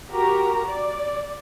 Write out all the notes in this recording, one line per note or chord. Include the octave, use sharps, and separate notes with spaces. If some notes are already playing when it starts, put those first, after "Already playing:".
F#4 G4 A#4 A#5
D5